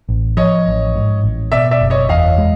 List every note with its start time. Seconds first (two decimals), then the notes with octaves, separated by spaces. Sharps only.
0.09 A1
0.37 F3 C#5 D#5
0.67 A1
0.95 G#2
1.23 A1
1.52 B2 D5 E5
1.71 D5 E5
1.81 F#1
1.90 C#5 D#5
2.09 E2 D#5 F5
2.38 G#3